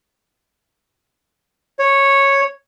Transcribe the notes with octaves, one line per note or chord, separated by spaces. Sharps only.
C#5